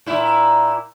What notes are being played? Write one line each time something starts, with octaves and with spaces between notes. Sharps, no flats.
A#2 E4